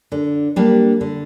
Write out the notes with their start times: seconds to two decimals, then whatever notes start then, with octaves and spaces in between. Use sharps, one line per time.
0.12 D3
0.56 G3 A#3 D4 G4
1.01 D3